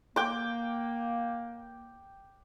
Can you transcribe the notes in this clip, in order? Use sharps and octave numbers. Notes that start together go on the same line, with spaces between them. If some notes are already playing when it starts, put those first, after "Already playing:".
A#3 G5 D6